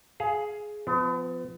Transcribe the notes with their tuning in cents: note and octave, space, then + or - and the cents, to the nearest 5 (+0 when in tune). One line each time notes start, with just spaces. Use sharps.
G#4 +15 F5 -10
F3 +0 B3 +40